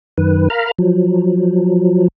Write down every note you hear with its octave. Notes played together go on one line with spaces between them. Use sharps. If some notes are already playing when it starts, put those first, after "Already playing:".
F#2 D#3 B4
A#4 F5 A#5 B5 F6
F3 F#3